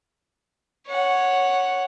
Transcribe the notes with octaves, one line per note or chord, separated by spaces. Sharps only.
C#5 F#5